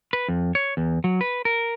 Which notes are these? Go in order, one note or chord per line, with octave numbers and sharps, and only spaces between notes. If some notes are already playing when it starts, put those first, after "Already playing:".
B4
F2
C#5
E2
F#3
B4
A#4